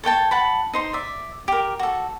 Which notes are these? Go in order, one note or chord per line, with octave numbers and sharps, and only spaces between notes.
A4 C#5 G5 A5
F#5 A5 B5
D#4 C5 C6
D5 E5
G4 A#4
F#4 A4